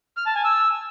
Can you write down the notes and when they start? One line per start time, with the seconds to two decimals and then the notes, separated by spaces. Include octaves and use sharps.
0.17 F6
0.26 A5
0.35 G#5
0.44 E6